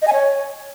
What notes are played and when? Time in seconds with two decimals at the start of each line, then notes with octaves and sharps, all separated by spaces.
0.02 D#5
0.07 G#5
0.13 C#5